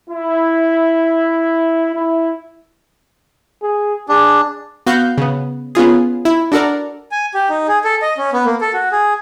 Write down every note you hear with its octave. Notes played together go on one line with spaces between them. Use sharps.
E4
E4
G#4
D4 G#4
B3 F#4 F5 G6
C#3 B3
B3 C#4 F4 G#4
E4
D4 F#4 A4 A#4 D5
G#5
G4
D#4
G#4
A4
D#5
C#4
B3
A#3
A4
F#4
G#4